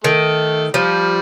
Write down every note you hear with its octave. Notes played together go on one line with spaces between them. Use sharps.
D#3 A3
F3 G3